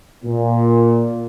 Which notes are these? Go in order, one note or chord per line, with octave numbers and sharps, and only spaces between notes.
A#2